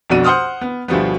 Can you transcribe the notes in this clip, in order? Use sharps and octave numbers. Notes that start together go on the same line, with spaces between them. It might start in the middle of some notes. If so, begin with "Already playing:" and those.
B1 F2 B2 D4 F#4 D#7
C5 F#5 C6 D#6 F6
B3
D2 B2 F3 G3 B3